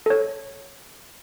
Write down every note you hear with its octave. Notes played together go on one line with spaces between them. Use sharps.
A4 C#5